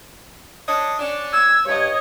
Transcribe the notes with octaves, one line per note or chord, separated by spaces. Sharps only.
D4 C#5 D#5
C#4 D4
E6 G#6
G2 C#5 D#5